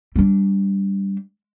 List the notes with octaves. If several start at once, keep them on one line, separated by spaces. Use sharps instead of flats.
G3 D4